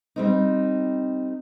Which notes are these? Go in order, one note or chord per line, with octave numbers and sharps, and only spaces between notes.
G3 C4 D#4